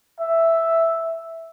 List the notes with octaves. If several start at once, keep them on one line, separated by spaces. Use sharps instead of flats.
E5